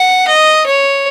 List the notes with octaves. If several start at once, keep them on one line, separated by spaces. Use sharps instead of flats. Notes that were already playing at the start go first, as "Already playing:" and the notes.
Already playing: F#5
D#5
C#5